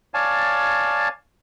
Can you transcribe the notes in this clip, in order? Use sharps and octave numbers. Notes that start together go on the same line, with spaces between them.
C#5 D5 F5 G#5 A5